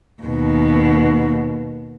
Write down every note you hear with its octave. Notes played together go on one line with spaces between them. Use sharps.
D#2 B2